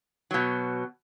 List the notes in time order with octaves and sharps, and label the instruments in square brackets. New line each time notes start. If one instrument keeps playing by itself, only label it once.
[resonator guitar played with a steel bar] B2 F#3